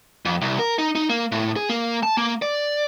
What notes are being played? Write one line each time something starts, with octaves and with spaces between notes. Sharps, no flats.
F2
C2
A#4
D#4
D#4
A#3
A2
G#4
A#3
A5
A#3
D5